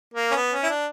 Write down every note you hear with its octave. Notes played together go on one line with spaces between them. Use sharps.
A#3
C#4
B3
C#4
E4
D4